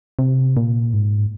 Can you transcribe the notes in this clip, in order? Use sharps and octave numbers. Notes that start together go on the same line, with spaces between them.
C3
A#2
G#2